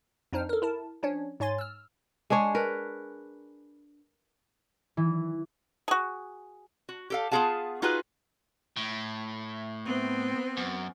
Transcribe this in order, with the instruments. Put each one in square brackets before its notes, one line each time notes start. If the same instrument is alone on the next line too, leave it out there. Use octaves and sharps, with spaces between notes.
[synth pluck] F2 D4 D#4 C5 F6
A4 A#4
E4 A#4 A5
F3 C#4 D4 C#5
G#2 C#5 G#5 C6 A6
E6 F6
[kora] G#3 D4 G#4 C#5
A#4 B4
[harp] E3
[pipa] F#4 G#4
[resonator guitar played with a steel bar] F#4
G4 A4 F5
B3 F4 F#4 G#4 F5 A5
D#4 F4 F#4 G#4 B4
[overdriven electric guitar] A2
[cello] B3 C4
[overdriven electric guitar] F#2